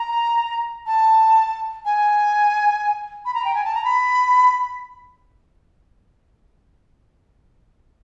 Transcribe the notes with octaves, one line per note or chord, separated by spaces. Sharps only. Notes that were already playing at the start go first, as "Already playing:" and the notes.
Already playing: A#5
A5
G#5
B5
A#5
G5
G#5
A5
A#5
B5